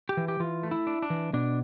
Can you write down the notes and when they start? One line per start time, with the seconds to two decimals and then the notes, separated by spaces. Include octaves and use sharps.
0.09 G4
0.17 E3
0.28 G4
0.40 E3 F4
0.63 A3
0.71 E4
0.87 D4
1.02 D4
1.10 E3
1.33 B2 D4